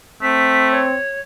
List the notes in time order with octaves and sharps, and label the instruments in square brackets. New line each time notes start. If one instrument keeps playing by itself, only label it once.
[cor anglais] A3 [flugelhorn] C4 [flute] B6
[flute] C#5